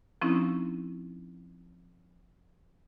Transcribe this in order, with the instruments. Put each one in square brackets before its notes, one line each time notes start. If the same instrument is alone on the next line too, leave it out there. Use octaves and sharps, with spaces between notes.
[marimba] F3 C4 C#4 D#4 E4